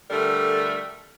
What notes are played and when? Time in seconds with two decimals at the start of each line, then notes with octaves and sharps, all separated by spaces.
0.10 D3 G3 A3 A4 A#4